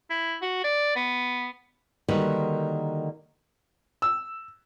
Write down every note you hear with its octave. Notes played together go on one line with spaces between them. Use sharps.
E4
F#4
D5
B3
D3 D#3 G3 A#3 F#4 B4
E6